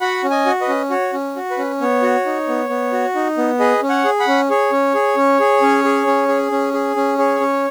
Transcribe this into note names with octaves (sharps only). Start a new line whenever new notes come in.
F#4 F#5 B5
C#4
D#5 G#5
F#4
B4 D#5
C#4
F#4 C#5
C#4
F#4
B4
C#4
B3 C#5
F#4
D#4
B3
B3
F#4
D#4
B3
G#4 B4 D#5
C#4
C#5 F#5
G#4
F#5 B5
C#4
G#4 C#5
C#4
G#4
C#4
G#4
C#4
G#4
C#4
G#4
C#4
G#4
C#4
G#4 C#5
C#4